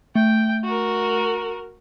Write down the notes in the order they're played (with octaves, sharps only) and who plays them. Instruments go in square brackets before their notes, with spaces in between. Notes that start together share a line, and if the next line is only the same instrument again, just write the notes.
[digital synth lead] A3 [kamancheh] G5
[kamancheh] F#4 A#4